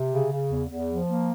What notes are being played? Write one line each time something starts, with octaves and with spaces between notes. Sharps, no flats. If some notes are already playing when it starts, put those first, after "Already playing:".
Already playing: C3
C#3
C#3
E2
E2
F3
A#3